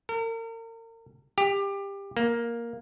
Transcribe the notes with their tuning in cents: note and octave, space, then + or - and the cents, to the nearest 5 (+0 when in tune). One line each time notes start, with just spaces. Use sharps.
A#4 -40
G4 +20
A#3 +5